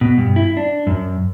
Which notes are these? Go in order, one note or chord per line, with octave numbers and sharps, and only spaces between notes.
B2
G2
E4
D4
F#2